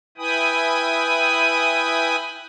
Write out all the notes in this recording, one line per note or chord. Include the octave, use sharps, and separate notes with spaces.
E4 B4 G5 G#5 B5 D#6